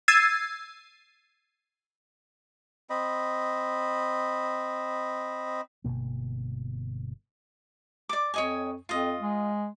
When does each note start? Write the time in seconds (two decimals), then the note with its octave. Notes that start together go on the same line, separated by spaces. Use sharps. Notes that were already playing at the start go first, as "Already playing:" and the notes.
0.08 E6 G#6 A6 C7 D#7
2.90 C4 D#5 B5
5.84 G1 G#2 B2 A#3
8.09 D5 D6
8.34 F2 C#5 D#5 G#5
8.89 F2 F4 D#5
9.20 G#3